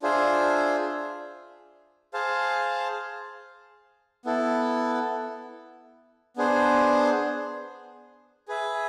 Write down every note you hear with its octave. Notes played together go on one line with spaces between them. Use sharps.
D4 F4 G#4 C5 E5
G#4 C5 F5 A5
B3 E4 A4
B3 D4 G#4 C5
G#4 B4 E5